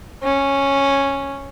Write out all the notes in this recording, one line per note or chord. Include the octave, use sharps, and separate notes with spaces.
C#4